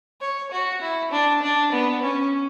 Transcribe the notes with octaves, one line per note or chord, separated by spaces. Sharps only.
C#5
F#4
E4
D4
D4
B3
C#4